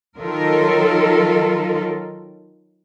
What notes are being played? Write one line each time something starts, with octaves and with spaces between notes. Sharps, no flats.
D#3 F#3 F4 A4 A#4